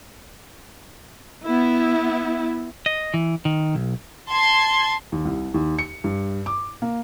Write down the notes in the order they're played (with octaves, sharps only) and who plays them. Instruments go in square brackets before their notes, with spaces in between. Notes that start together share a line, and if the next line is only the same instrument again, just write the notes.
[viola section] B3 E4
[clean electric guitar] D#5
E3
D#3
B1
[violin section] A5 C6 G#6
[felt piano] D#2
C2
D#2
C#7
G2
D6
A#3